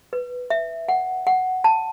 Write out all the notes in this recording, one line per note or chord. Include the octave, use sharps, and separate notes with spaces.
B4
E5
F#5
F#5
A5